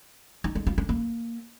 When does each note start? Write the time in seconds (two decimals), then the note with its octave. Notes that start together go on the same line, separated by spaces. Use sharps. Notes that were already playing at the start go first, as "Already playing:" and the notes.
0.44 D#4
0.55 G#3
0.67 F4
0.78 D4
0.89 A#3